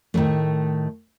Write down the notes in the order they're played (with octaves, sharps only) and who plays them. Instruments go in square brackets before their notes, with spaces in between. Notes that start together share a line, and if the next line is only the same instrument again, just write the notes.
[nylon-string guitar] A2 D#3 E3 F#3 A3